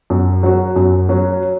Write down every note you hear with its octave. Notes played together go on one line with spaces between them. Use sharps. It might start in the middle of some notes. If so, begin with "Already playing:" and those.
F#2
F#3 C#4 F#4
F#2
F#3 C#4 F#4